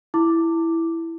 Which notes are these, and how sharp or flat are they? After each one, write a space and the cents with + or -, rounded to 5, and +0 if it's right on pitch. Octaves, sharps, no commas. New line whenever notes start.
E4 +0 D6 +0